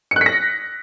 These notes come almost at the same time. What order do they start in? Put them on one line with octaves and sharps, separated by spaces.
C#7 F#6 B6 A#6